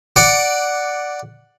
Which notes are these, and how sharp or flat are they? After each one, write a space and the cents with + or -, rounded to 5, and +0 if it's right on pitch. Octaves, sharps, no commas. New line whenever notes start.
D5 +0 F#5 +0 D6 -10